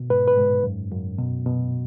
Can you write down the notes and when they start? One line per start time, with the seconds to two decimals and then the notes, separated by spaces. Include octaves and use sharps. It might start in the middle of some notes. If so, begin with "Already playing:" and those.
Already playing: B2
0.10 G#2 B4
0.28 B4
0.37 G#2
0.64 F#2
0.92 F#2
1.19 B2
1.46 B2